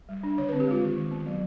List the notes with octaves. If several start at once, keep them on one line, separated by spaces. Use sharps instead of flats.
G3
D4
D3 C#5
B4
C4
G4
G#3 F4
D#3
D#3
B3
F#3